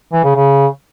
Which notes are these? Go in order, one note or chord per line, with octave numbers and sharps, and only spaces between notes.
E3
C#3
C#3